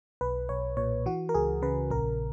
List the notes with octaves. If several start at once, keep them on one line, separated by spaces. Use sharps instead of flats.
B1 B4
B1 C#5
A#2 C#5
E3 F#4
A#4
C#2 G#4
C#3 B4
A#1 A#4